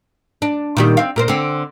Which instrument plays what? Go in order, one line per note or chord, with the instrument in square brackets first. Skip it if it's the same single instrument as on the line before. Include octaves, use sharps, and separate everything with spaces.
[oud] D4
A#2 D#3 G3
C4 F5
A#2 A#4 C5
D3 C4